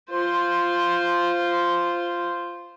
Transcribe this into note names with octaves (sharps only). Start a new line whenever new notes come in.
F4 C5